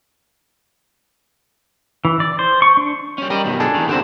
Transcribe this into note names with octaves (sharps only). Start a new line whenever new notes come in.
E3
D5
C5
C#6
D4
G3 C#4
G3 A#4 D#5
F#2 B2 D#3
D4 G#4 A4
D#3 E3
D3 C4 G4 A5